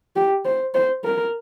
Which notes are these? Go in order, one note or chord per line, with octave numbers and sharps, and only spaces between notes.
G4
C5
C5
A#4